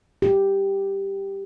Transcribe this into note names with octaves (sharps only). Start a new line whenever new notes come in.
G4